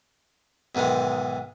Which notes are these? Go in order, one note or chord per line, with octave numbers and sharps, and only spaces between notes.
B1 G#2 D#3 E3 G#3